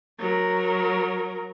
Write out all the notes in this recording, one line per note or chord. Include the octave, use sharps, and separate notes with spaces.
F#3 A#4